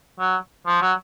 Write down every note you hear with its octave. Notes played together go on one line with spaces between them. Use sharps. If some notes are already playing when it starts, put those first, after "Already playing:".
F#3
F3
F#3